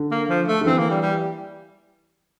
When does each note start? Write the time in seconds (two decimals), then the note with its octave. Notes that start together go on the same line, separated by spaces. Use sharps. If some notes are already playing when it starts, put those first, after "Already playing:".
Already playing: D3
0.11 A#3
0.29 F3
0.48 A3
0.61 D3
0.66 E3 C4
0.78 A#3
0.91 G3
1.02 G3